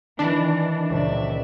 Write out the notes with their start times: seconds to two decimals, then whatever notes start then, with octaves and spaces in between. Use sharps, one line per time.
0.19 D#3 E3 D4
0.90 C#2 A#2 D5 E5